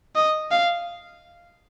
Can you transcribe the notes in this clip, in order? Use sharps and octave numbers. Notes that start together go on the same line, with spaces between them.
D#5
F5